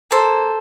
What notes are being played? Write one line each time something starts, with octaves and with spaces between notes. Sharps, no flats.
A#3 A4 C5